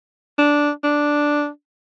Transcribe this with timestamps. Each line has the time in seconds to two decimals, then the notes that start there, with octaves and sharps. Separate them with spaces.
0.38 D4
0.84 D4